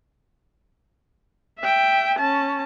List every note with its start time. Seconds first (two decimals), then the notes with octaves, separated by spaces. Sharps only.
1.60 E5 G5
2.19 C#4 A5